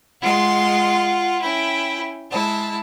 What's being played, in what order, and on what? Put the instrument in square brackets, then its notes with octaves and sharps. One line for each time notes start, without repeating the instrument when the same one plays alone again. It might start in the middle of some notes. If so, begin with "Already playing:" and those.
[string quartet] G#3 C6 [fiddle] F4 F#5
[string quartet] C#4 [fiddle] E4 G5
[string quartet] G#3 E4 [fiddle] A5